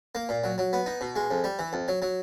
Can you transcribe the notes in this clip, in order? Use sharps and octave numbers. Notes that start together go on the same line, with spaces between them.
A#3
A#2
F#3
F#3
B3
D#4
B2
G#3
F2
G3
E3
F2
F#3
F#3